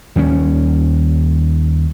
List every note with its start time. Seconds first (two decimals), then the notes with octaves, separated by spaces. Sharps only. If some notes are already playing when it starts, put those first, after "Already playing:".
0.16 D#2 G3 B3 C#4